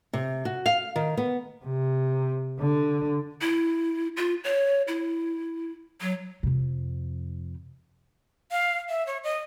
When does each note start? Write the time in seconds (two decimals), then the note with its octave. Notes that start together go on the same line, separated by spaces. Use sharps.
0.13 C3
0.45 F#4
0.66 F5
0.96 D#3
1.17 B3
1.65 C3
2.60 D3
3.42 E4
4.17 F4
4.44 C#5
4.88 E4
6.01 F#3
6.43 F2 C3
8.51 F5
8.89 E5
9.07 C#5
9.24 D#5